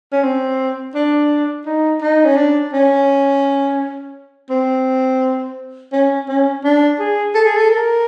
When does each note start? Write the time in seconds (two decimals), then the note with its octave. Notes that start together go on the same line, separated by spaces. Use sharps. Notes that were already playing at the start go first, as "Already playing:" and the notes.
0.12 C#4
0.23 C4
0.95 D4
1.66 D#4
2.02 D#4
2.25 C#4
2.37 D4
2.73 C#4
4.50 C4
5.92 C#4
6.28 C#4
6.64 D4
6.99 G#4
7.35 A4
7.45 G#4
7.55 A4
7.70 A#4